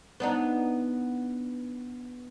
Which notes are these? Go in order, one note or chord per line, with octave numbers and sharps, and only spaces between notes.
B3 D4 D#4